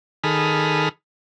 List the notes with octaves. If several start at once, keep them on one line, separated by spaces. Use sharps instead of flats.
D#3 G#4 A4 B5 D#6 F6